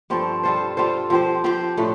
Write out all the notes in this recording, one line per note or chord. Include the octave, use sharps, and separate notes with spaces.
G2 F3 C4 A4
G3 F4 A4 C5
G3 F4 A4 C5
F3 C4 G4 C5
F3 C4 G4 C5
A2 A3 D4